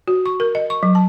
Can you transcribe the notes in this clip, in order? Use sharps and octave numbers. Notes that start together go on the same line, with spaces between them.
F#4
C#6
A#4
D#5
C#6
F#3
A5